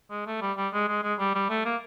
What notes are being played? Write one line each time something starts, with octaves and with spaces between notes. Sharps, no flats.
G#3
A3
G3
G3
G#3
G#3
G#3
G3
G3
A3
A#3